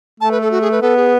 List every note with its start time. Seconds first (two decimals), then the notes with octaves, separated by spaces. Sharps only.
0.20 A3 A5
0.31 B4
0.41 A4
0.51 F#4
0.62 G#4
0.72 B4
0.82 B3 A4
0.97 G#4